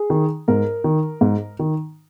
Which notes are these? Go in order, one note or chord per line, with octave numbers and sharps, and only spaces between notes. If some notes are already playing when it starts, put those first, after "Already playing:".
Already playing: G#4
D#3
G#2 A#4
D#3
G#2
D#3